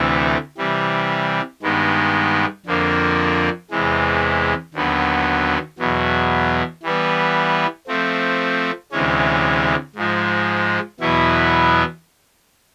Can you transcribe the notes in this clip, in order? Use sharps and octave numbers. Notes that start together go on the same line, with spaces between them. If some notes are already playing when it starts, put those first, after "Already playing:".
Already playing: D2 C3 E3 A3
C3 E3 G3
G2 D#3 G#3 B3
F2 D3 F3 A#3 D4
E2 C3 E3 G#3
D#2 D3 F#3 B3
E2 B2 F#3
E3 G3 B3
F3 A3 C4
D2 C3 E3 G#3 C#4
G#2 F3 G#3
E2 B2 F#3 B3 E4